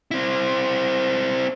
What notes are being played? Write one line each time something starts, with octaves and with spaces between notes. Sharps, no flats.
C4 E4